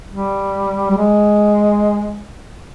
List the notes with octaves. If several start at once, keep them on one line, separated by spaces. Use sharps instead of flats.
G3
G3
G#3